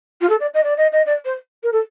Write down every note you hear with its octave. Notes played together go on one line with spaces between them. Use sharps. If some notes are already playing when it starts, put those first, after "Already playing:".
F4
A4
D5
D#5
D5
D#5
D#5
D5
C5
A#4
A4